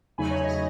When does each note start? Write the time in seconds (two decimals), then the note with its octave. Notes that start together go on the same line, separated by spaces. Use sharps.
0.18 E2 C#3 F#3 A3 D#4 G#5 B5
0.31 C#5
0.44 D#5